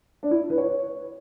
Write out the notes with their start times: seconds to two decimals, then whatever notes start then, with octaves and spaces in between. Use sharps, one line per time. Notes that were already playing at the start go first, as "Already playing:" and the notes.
0.23 D4
0.31 E4
0.50 B4
0.58 C#5